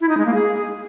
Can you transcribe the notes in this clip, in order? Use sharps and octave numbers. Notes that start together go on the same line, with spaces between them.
E4
D#4
G#3
A#3
G#4